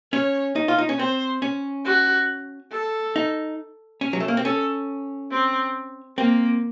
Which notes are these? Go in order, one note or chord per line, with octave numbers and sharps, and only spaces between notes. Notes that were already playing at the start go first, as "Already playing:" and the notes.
C#4 C#5
D#4
F4
D#4
C#4
C4 C5
C#4
F#4
A4
D#4
C#4
F#3
A3
A#3
C4
C#4 A4
C4
A#3 C4